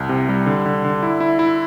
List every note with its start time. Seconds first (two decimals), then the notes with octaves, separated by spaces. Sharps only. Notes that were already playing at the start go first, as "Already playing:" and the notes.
Already playing: C2
0.09 C3
0.29 G3
0.46 D3
0.66 D3
0.84 D3
1.03 E4
1.20 E4
1.39 E4